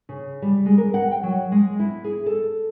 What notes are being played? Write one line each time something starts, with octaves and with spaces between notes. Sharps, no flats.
C#3
G3
G#3
A#4
F#5
G5
F#3
G#3
E4
G#4
A4